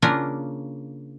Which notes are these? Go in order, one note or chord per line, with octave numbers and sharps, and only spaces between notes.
C#3 A#3 C#4 D4 F4 A#4